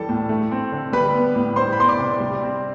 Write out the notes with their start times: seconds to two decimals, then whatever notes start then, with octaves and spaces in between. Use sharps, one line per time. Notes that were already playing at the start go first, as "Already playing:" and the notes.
Already playing: E3 G3 A4 A5
0.09 A2
0.29 A3
0.51 C4
0.72 D3
0.92 G3 B4 B5
1.14 B3
1.35 A2
1.56 G3 C5 C6
1.73 B5
1.78 B3 C6
1.88 D5 D6
1.99 C3
2.20 G3
2.42 C4